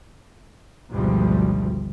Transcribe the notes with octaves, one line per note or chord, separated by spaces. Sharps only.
G#1 D2 B2 F3 G3